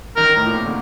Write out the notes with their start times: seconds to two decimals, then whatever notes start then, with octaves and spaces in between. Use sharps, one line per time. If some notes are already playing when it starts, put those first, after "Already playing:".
0.16 D#3 A#4
0.36 A2
0.46 A#2
0.56 C3
0.66 D3